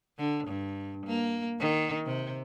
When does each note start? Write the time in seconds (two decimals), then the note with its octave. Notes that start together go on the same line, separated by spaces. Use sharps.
0.18 D3
0.47 G2
1.06 A#3
1.59 D#3
2.06 C3